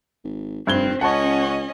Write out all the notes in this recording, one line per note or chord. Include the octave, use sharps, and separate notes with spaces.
G#1
F1 G2 C4 G#6 G7
C#2 C#4 D#5 F#5 A5 C#6